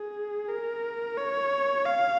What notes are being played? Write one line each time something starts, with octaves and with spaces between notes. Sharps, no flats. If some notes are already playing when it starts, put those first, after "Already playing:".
Already playing: G#4
A#4
C#5
F5